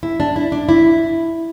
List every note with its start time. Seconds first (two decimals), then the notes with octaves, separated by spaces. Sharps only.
0.03 E4
0.20 D4
0.36 E4
0.52 D4
0.69 E4